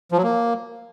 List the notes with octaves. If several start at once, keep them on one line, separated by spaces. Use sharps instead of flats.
F3
F#3
A#3